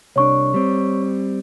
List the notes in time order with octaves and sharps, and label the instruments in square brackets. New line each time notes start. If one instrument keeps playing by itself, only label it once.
[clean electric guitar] C2 D4 [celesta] C#5 C#6
[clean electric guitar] G3 C4